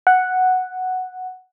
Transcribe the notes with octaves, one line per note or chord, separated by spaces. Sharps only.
F#5